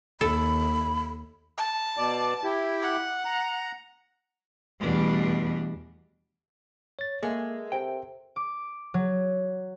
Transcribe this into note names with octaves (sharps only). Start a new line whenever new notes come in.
D#2 A4 B5
A5
B2 D5
E4 G4
F#5
A#5
E2 B2 G3 A3 D4
C#5 A6
G#3 A#3 A4 A#4 E5
C3 G5
D6
F#3